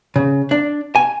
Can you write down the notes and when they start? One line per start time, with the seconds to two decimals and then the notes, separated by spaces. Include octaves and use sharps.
0.16 C#3
0.51 D4
0.96 G#5